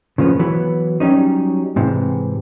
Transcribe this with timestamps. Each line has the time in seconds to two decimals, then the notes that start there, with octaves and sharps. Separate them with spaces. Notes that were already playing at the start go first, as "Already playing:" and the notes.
0.18 C#3 F3 A#3 B3
0.39 E3 F#3 B3
1.00 F#3 G3 C#4 D#4
1.76 G#2 C3 E3